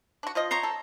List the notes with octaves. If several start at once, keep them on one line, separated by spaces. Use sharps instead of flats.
D4 F#4
F3 F4 D#5
C5 C#5 A#5
A4